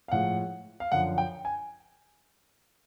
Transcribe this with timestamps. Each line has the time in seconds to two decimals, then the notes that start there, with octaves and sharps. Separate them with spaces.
0.08 F5
0.12 A2 F3 G#3 F#5
0.80 F5
0.92 F#2 D3 F3 F#5
1.18 G5
1.45 G#5